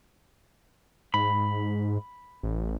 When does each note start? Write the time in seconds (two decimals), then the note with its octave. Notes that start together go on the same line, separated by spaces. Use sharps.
1.14 G#2 B5
2.43 A1